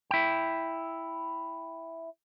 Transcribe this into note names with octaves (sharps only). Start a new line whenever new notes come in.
E4 G5